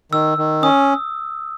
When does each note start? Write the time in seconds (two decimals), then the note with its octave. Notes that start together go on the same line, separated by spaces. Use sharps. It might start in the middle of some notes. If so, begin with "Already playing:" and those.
0.12 D#3 E6
0.38 D#3
0.63 C#4 D#6